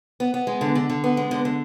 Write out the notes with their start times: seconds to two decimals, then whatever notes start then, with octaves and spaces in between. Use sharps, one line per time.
0.20 B3
0.34 B3
0.47 G#3
0.61 D3
0.75 D3
0.90 D3
1.04 B3
1.17 G#3
1.31 D3
1.45 D3